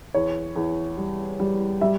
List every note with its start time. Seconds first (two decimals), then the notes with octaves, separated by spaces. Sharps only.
0.14 E2 C#5
0.56 E2
0.97 G3
1.40 G3
1.81 G3 E5